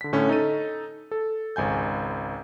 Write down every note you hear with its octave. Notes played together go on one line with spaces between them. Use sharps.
D3 B6
A2 D3 C#4
D#4 A4 D#7
A4
G#1 C#2 G#5 G6